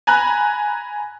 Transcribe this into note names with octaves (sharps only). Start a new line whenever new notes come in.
G#5 A#5 B5 F#6